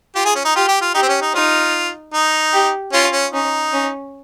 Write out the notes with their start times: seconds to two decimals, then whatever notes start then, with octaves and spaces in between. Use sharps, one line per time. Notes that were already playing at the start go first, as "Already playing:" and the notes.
0.15 F4 G4
0.25 G#4
0.36 C#4
0.45 D#4
0.56 F4 G4
0.68 G4
0.82 F4
0.94 D#4 G4
1.02 C4
1.09 C#4
1.22 D#4
1.34 D#4 F4
2.14 D#4
2.53 G4
2.93 C#4 F4
3.12 C#4
3.33 C#4 D#4
3.73 C#4